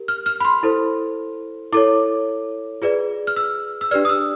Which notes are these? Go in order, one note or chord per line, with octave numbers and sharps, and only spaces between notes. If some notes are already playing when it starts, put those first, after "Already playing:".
Already playing: G4 A#4
F6
F6
B5
C6
E4 A4 C5
E4 A4 C#5 D6
F4 G#4 B4 D5
F6
E6
E6
D4 G4 B4 D5 F6
D#6
E6